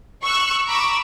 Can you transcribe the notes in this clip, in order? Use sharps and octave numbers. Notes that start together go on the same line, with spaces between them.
C#6 E6 F#6
A#5 B5 C#6 D6 E6